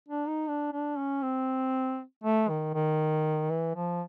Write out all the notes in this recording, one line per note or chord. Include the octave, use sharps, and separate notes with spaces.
D4
D#4
D4
D4
C#4
C4
A3
D#3
D#3
E3
F3